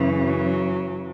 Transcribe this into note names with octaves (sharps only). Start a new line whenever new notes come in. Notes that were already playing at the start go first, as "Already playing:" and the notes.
Already playing: F#2 C#3 E3
F#3